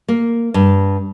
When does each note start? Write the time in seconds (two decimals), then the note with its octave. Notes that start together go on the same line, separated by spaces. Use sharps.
0.08 A#3
0.54 G2